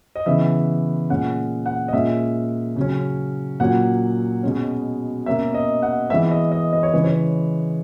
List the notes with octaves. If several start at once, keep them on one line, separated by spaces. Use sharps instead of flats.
D#5
C#3 E3 B3 E5
A#2 G#3 C#4 F#5
F#5
D#5
A#2 G#3 C#4 E5
C#3 F#3 C#4
A#2 F#3 C#4 F#5
B2 G#3 C#4
B2 A#3 C#4 E5
D#5
F#5
E3 G#3 B3 E5
D#5
D#5
D#5
C#5
C#3 E3 G#3 B4
C#5